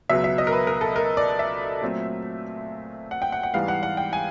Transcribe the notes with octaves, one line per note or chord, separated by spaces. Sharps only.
C#2 B2 F#3 B3 E5
E5
D#5
A#4
B4
A#4
A4
A#4
D5
E5
A#2 F#3 A3 C4
F#5
G5
F#5
F#5
G#2 E3 G3 B3 F5
F#5
F#5
G5
G#5